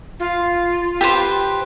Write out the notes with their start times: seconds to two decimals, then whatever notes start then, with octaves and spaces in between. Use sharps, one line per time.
0.20 F4
1.01 G4 B4 C5